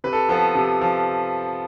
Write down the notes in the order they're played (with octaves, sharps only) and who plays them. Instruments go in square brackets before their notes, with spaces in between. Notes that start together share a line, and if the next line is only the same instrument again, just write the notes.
[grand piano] C3 B4
A4
F3 B3 A4
C3
F3